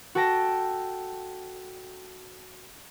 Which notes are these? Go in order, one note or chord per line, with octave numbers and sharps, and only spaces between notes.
F#4 A4 G5 A5 A#6